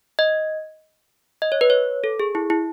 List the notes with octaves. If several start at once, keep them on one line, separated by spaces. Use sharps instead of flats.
D#5
D#5
C#5
B4
C#5
A4
G#4
E4
E4